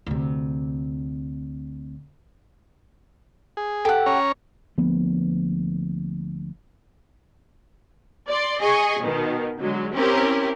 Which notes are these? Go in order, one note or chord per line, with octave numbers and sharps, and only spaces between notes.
D2 C3
G#4
G4 A4 F#5
C#4 C#5 A#5
D2 F3 A#3 B3
D5 C6
G#4 D#5 G#5 C#6 D#6
B2 D#3
D3 F#3 G#3
C4 C#4 E4 G4 A#4